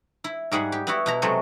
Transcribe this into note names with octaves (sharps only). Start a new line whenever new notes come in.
E4
G#2 G3 G#4 F#5
G4
B3 E4 F#4
B2 E4 A#5
C3 F#3 G#3 A3